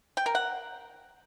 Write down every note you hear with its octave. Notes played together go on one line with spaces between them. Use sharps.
G5
A#4
F#5